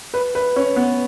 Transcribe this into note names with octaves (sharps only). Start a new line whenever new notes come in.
B4
B4
C#4
B3